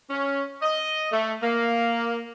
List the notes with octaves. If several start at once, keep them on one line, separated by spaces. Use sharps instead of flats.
C#4
D#5
A3
A#3